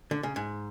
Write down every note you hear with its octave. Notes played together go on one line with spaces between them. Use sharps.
D3
C#3
G#2